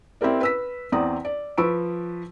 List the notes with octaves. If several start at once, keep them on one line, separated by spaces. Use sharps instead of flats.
C4 E4 G4 A#4 D5
B4 E6 B6
E2 C4 D5 A#5 D#6
D5
F3 B4 B5 C#6 E6 D7